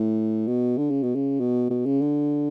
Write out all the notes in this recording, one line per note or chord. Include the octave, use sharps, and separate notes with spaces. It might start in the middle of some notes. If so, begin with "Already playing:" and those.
Already playing: A2
B2
D3
C#3
B2
C#3
B2
B2
C#3
D3